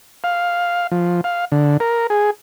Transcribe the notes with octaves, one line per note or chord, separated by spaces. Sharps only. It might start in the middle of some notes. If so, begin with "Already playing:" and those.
F5
F3
F5
D3
A#4
G#4